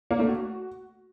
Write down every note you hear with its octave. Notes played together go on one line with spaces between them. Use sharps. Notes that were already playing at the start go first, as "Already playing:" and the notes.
A#3
A3
F#4